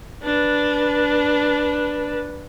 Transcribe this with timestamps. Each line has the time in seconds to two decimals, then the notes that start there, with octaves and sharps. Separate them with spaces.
0.23 D4 B4